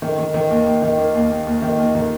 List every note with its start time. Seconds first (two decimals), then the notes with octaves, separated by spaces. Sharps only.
0.02 D#3
0.18 D#3
0.34 D#3
0.50 D#2
0.66 D#2
0.82 D#3
0.99 A#3
1.15 D#2
1.30 D#2
1.46 D#2
1.62 D#3
1.79 D#2
1.95 D#3